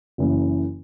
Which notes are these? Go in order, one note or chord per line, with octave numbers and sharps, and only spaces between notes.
F#1 F#2 E3